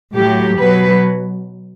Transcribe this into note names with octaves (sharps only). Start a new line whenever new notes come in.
A2 F#3 G4
B2 F#3 B4